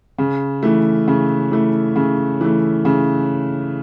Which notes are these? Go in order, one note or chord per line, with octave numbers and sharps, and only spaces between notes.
C#3
E3 A3
C#3
E3 A3
C#3
E3 A3
C#3